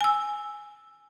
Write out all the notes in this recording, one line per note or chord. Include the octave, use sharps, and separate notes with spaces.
G#5 E6